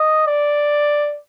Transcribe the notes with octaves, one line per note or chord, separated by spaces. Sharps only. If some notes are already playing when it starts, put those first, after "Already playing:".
Already playing: D#5
D5